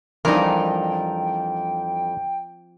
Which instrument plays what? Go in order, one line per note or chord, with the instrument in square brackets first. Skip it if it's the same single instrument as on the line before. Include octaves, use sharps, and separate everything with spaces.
[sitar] F2 [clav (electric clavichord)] E3 G3 D4 [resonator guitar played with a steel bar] D#4 A#4 [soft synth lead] G5